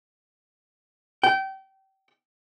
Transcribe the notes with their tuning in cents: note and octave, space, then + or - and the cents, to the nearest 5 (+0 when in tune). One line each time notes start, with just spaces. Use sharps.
G5 -25